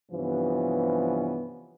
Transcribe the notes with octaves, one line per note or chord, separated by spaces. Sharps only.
G2 C3 E3 F3 B3 C#4